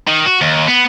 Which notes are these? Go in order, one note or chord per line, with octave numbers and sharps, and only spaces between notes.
D#3
F#4
D#2
B3